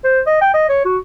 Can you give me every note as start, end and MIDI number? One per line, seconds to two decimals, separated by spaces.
0.04 0.20 72
0.26 0.40 75
0.41 0.50 79
0.54 0.68 75
0.69 0.82 73
0.85 0.98 66